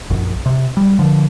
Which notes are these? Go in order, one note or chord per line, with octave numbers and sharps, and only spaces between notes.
A#1 F#2
C3
G3
D3 F3